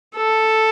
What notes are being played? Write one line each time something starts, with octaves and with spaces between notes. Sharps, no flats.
A4